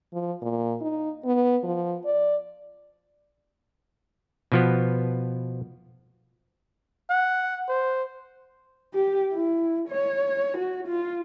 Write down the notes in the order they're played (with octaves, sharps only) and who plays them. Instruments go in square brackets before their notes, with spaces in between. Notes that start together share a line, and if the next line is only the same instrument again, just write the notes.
[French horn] F3
A#2
D#4
B3
F3
D5
[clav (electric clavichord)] B2 F3 B3
[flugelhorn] F#5
C5
[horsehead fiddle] G4
E4
C#5
F#4
F4